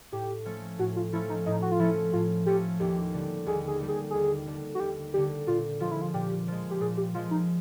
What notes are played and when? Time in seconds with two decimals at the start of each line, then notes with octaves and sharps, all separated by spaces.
0.12 A2 G4
0.45 F3 A3 C#4
0.79 A2 F#4
0.96 F4
1.13 F3 A3 C#4 E4
1.30 D#4
1.46 A2 D#4
1.62 F#4
1.72 F4
1.79 F3 A3 C#4 E4
2.13 A2 F4
2.46 F3 A3 C#4 G4
2.80 D#2 G4
3.14 D3 G3
3.46 D#2 G#4
3.67 G#4
3.81 D3 G3
3.88 G#4
4.10 D#2 G#4
4.47 D3 G3
4.75 F#4
4.80 D#2 G4
5.14 D3 G3 G4
5.47 A#2 F4
5.80 F3 G#3 F4
5.91 E4
6.02 F4
6.14 A#2 G4
6.48 F3 G#3
6.71 G4
6.80 A#2 G#4
6.97 G4
7.14 F3 G#3 F4
7.31 D#4